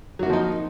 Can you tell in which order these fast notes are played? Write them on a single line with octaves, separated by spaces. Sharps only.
F#3 F#4 A#3 F3 D#4